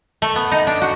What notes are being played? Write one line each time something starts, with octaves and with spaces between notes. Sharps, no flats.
A3
B3
D#4
D4
F#4